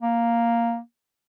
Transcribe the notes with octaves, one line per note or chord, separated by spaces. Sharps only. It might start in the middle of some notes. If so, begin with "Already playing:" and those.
A#3